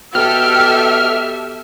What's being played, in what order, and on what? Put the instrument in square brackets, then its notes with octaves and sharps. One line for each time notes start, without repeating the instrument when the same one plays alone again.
[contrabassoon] B2 [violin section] G4 A4 [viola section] E5 [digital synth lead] F6